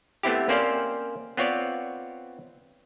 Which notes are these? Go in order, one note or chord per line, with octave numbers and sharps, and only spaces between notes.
A3 B3 C4 E4 G4
A#3 C4 C#4 C5 D5 F5
B3 C4 F4 C#5 D5